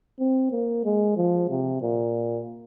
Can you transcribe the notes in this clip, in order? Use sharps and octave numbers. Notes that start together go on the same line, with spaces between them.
C4
A#3
G#3
F3
C3
A#2